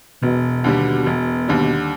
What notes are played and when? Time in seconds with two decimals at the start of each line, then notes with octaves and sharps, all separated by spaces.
0.22 E1 B2
0.64 D#2 D3 G3
1.06 E1
1.48 D#2 D3 G3